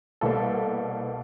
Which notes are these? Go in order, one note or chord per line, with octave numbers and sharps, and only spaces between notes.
C2 B2 G3 A#3 A4